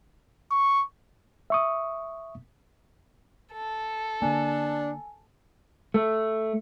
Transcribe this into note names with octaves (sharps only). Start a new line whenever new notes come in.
C#6
E5 C#6 D#6
A4
D3 A#3 D4 G#5
A3